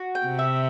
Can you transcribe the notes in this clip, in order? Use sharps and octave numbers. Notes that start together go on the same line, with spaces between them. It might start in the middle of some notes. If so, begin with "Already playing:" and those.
Already playing: F#4
G5
C3
E5